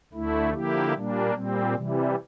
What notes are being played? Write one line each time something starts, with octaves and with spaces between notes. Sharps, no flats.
D2 D3 A3 E4
D3 F3 A#3 E4 G4
A#2 G3 A#3 D4
A#2 G3 C4
C3 E3 G3